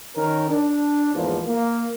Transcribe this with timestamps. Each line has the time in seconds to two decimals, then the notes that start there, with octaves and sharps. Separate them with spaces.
0.16 D#3 C#4 A#4
0.49 D4
1.14 E2 G#2 F3 A#3
1.47 A#3